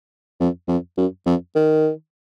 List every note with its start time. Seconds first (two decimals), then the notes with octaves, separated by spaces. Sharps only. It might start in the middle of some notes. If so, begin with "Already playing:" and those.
0.40 F2
0.68 F2
0.97 F#2
1.26 F2
1.55 D#3